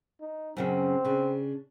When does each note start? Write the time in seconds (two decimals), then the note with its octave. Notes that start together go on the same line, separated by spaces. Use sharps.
0.20 D#4
0.57 F#2 C#3 F#3 C4
1.05 C#3 D4